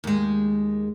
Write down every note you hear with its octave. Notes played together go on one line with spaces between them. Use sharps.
D#2 G#3